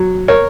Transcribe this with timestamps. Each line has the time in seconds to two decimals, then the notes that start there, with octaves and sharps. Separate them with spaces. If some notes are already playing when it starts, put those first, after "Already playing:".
Already playing: F#3
0.28 A#4 C#5